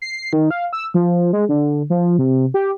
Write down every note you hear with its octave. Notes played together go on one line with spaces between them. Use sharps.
C7
D#3
F5
E6
F3
G#3
D3
F3
C3
G4